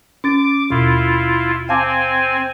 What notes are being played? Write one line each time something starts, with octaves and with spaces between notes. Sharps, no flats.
C#4 D6 A6
D#2 B2 E4 F4
C4 F5 G#5 A5 D6